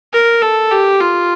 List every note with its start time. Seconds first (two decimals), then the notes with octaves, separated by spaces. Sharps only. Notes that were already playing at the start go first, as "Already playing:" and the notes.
0.13 A#4
0.42 A4
0.71 G4
1.00 F4